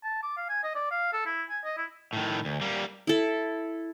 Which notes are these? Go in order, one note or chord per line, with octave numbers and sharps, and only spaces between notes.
A5
D6
F5
G#5
D#5
D5
F5
A4
E4
G#5
D#5
E4
A2 D#3
D2
G3 A#3
E4 A4